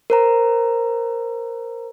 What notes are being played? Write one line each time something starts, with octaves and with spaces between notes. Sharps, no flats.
A#4 C5 A#5